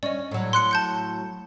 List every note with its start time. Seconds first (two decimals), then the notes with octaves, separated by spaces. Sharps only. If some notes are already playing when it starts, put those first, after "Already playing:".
0.03 C#4 D5 D#5
0.31 A2 F#3
0.53 C6 F#6 C#7
0.71 A5 G6 C#7